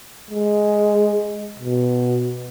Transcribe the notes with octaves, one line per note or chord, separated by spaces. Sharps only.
G#3
B2